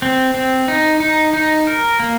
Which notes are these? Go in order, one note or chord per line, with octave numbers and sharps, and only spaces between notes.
C4
C4
D#4
D#4
D#4
A#4
A#3